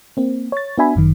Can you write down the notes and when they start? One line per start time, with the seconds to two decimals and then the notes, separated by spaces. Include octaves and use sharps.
0.17 A#3 C4
0.52 C#5 A6
0.78 B3 D4 F#4 E5 G#5 B5
0.95 G1 F#2 D#3